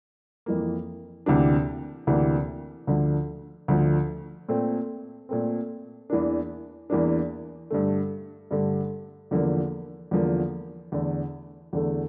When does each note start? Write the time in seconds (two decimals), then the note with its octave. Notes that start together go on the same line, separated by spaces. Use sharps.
0.46 F2 E3 A#3
1.26 D2 C3 E3 A#3 D4
2.07 D2 C3 E3 A#3 D4
2.87 D2 D3 F3
3.68 D2 D3 F3
4.49 A#2 A3 C4
5.29 A#2 A3 C4
6.10 E2 E3 A#3 D4
6.90 E2 E3 A#3 D4
7.70 G2 D3 A3
8.51 G2 D3 A3
9.31 E2 D3 F3 A#3
10.11 E2 D3 F3 A#3
10.92 E2 D3 A3
11.73 E2 D3 A3